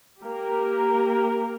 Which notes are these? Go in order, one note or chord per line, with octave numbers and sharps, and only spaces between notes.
A#3 G4 A#4